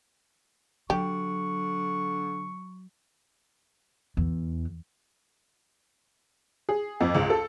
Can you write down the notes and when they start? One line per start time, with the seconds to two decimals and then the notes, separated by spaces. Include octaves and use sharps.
0.90 D3 F#3 G4 C#6
4.17 E2
6.69 G#4
7.01 F2
7.15 C#2
7.30 A4